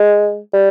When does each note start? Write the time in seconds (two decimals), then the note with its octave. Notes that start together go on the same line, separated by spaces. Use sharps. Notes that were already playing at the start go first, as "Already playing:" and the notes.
Already playing: G#3
0.53 G3